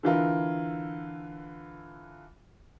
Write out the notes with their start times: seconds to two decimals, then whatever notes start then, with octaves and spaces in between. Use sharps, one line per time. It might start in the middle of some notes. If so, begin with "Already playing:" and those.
0.03 D3 E3 F4 A#4